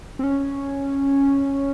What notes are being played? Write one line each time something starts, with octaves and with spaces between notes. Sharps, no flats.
C4
C#4